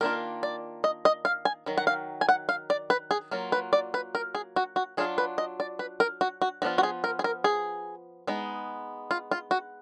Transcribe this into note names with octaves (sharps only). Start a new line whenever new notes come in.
D#3 A#3 D4 F4 A#4
D5
D#5
D#5
F5
G#5
D#3 F#3
F#5
F5
G#5
F#5
F5
D5
B4
G#4
F#3 A#3 F4
B4
D5
B4
A#4
G#4
F#4
F#4
F#3 D4 F4 G#4
B4
D#5
D5
B4
A#4
F#4
F#4
F3 B3 D4 F4 F#4
F#4
G#4
A#4
G#4
A#4
G#4
G#3 B3 D#4
F4
F4
F#4